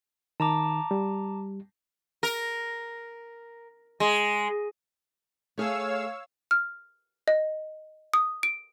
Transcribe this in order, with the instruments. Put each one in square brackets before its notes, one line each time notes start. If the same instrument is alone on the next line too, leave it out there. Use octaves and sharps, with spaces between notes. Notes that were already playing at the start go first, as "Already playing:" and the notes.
[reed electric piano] D#3 [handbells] A5 A#5 D6
[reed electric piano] G3
[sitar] A#4
G#3
[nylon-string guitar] A3 G#4 [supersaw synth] C#5 F5 E6
[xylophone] F6
D#5
D#6
D7